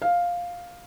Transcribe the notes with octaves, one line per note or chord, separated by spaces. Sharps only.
F5